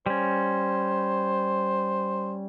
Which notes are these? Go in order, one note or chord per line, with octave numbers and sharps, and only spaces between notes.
G3 C#4 C5